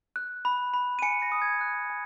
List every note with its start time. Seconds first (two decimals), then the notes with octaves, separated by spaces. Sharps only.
0.16 F#6
0.45 B5
0.74 B5
0.99 D#7
1.02 G#5 C#7
1.22 A#6
1.32 D#6
1.42 G#6
1.61 F#6
1.90 G#5